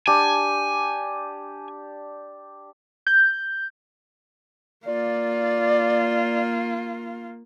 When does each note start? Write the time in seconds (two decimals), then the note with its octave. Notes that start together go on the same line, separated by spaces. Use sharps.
0.07 D4 G4 G#5 A5
3.07 G6
4.86 A#3 F4 D5